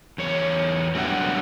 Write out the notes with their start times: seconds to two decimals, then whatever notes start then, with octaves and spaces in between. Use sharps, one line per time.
0.18 E2 C#5
0.95 F#3 G3 D4 E5 F#5 G5